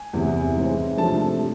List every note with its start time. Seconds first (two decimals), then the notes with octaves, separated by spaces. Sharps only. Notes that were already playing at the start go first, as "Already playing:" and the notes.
Already playing: G#5
0.13 E2 C3 E3
0.56 G#2 E3 G#3 C4
0.97 C3 F3 A3 D4 A5
1.39 G3